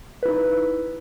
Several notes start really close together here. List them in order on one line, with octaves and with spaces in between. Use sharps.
B4 E4 D#4